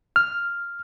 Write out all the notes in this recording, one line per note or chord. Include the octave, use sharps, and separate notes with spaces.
F6